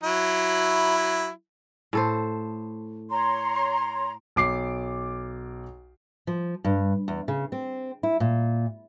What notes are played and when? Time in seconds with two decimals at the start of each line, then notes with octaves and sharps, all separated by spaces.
0.03 F#3 E4
1.93 A2 A4 C5
3.10 C#5 A#5 C6
4.36 B1 D6 C7
6.27 F3
6.64 G2
7.08 E2
7.28 C#3
7.52 C4
8.03 E4
8.20 A#2